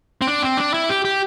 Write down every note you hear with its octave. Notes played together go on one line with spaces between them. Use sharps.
C4
D4
C4
D4
E4
G4
G4